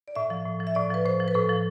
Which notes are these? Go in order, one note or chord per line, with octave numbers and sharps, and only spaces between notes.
D5
A2 E5
F3
A2
F3
E5
A2 D5
F3 B4
A2 C5
F3
B4
A2 A4
F3